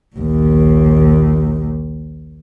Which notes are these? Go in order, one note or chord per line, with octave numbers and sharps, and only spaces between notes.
A#1 D#2